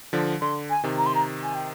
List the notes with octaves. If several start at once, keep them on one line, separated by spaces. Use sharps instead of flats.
D3 F3
D3 C6
G#5
C3 D#3
A#5
C6
A#5
G#5
G5